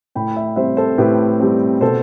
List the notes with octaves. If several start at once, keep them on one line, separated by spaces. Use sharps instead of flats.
A2 G5 B5
E5 G5
G3 C4 C5 E5
A4 C5
A2 G4 B4
G3 C4
B2 A4 C5